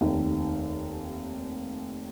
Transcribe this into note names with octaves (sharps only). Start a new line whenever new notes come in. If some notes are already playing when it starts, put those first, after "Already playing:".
F1 D#2 D#3